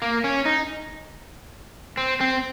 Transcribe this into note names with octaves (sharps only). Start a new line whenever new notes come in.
A#3
C#4
D#4
C4
C4